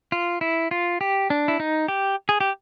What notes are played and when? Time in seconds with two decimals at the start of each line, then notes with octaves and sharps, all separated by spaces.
0.12 F4
0.41 E4
0.71 F4
1.01 G4
1.30 D4
1.48 E4
1.60 D#4
1.88 G4
2.29 G#4
2.41 G4